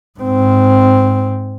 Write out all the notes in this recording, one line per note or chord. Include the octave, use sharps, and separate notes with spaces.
G#2 C4